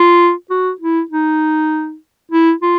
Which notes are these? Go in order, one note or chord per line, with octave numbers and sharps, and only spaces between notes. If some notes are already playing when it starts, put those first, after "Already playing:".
Already playing: F4
F#4
E4
D#4
E4
F4